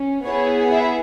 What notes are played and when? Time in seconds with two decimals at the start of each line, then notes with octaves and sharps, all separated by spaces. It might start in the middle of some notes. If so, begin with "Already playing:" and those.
Already playing: C#4
0.25 B3 E4 G#4 C#5
0.71 E4 E5